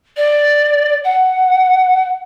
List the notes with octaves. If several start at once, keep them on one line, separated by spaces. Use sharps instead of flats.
D5
F#5